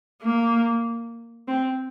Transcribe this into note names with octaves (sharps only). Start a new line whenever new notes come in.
A#3
C4